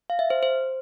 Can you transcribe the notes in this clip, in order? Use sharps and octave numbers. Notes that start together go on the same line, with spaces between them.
F5
E5
C5
C5